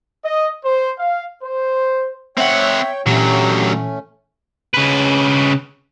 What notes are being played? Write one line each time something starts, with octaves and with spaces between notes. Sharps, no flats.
D#5
C5
F5
C5
C4 C#5 E5 F#5 G5
D2 A#2 E3 F#3 A3 C#4 G4
C#3 B4